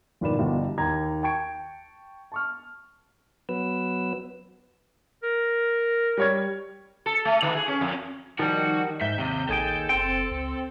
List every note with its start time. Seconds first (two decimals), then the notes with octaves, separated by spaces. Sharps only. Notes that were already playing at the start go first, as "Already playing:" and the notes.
0.21 G1 A#2 D#3 B4 D5 E7
0.38 G1 B2 G3 E4
0.78 D#2 A#5 G#6
1.23 G5 A5 C#6 G#6 D7
2.32 A5 C#6 F6
3.49 F#3 B3 B4 E6
5.23 A#4
6.17 G3 C#5 G#6
7.06 A4
7.25 A3
7.42 D#3
7.55 G#4
7.68 C#4
7.81 F2
8.39 D#3 F3 G3 F#4
9.01 G#2 E5 G6
9.18 D#2 C3
9.49 A#1 D#2 G#4 A4 G5
9.89 F#1 C4 G5
10.31 C#2